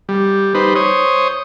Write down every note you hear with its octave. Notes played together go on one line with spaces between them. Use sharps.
G3
G3 D#4 B4 C5
C5 C#5 D#6